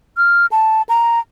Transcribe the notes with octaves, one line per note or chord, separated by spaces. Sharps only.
F6
A5
A#5